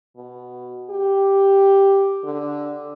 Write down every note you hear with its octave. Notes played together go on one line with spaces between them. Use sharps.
B2
G4
D3